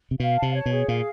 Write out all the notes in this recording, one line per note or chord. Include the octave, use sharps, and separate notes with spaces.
C3
B2 F5
A5
C3
C#5
B2
G#4
A#2 F5